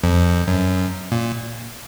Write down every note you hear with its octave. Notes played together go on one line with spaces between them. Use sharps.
F2
F#2
A#2